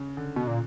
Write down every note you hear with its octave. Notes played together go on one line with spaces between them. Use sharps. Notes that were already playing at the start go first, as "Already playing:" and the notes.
Already playing: C#3
D3
B2
A#2